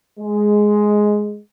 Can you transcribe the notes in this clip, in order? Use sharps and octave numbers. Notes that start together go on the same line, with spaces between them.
G#3